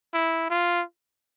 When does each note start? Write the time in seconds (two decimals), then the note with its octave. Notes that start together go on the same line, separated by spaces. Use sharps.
0.14 E4
0.50 F4